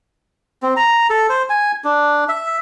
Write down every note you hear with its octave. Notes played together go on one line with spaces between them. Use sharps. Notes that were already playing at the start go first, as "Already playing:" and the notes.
C4
A#5
A4
C5
G#5
D4
E5